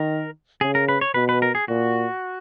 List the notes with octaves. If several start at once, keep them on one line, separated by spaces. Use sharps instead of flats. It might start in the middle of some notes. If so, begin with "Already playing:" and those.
Already playing: D#3 A#4
C#3 G#4
A#4
B4
C#5
B2 B4
B4
A#4
G#4
A#2 F#4